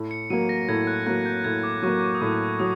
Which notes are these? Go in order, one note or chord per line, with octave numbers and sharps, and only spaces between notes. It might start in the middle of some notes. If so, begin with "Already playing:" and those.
Already playing: A2
C#7
F#3 A#3 D#7
A#6
A2 G#6
F#6
F#3 A#3 F#6
G6
A2 G#6
D6
F#3 A#3 C#6
C#6
D#6
A2 D6
F#3 D#6